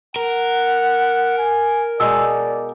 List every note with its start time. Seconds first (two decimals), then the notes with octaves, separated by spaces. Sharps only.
0.16 A#4 F#5
1.38 G#5
2.00 B2 G#3 D#4 D5 E6